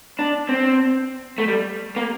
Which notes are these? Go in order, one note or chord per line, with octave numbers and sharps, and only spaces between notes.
D4
C4
A3
G3
A#3